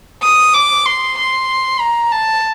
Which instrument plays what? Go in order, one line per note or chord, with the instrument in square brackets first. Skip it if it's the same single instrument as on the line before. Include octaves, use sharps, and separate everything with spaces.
[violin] D#6
D6
C6
C6
A#5
A5